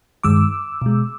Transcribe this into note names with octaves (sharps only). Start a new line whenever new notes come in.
G2 D#3 G#3 D6 E6
B2 G#3